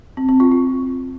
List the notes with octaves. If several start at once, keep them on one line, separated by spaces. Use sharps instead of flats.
C4
C4
F4
F4